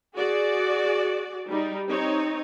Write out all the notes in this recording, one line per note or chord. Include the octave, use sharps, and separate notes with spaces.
F#4 G#4 D5
G3 D#4
C4 D#4 C#5